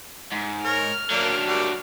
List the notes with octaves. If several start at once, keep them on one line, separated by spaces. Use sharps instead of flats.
G#2
A#4 C#5 F6
F#3 A#3 D4
G3 A#3 F#4